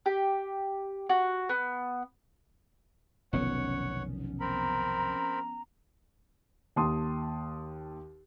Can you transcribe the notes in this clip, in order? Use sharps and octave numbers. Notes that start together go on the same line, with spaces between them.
G4
F#4
B3
F1 B1 D#3 F3 B3 C#4 C#5 F#5
C4 A#4 A#5 B5
D#2 A5 C6 D#6